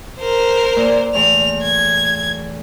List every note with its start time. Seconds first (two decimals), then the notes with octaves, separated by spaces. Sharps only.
0.19 A#4 C5
0.76 A#2
1.14 E2 A2 F7
1.63 G#6